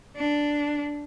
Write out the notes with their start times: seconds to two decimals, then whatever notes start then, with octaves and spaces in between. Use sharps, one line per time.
0.16 D4